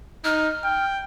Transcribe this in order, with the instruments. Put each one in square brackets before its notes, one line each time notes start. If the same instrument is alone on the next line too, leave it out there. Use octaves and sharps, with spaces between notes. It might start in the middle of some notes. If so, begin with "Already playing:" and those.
[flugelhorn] D#4 [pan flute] F6
[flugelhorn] G5